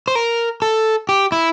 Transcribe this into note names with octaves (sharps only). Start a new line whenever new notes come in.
C5
A#4
A4
G4
E4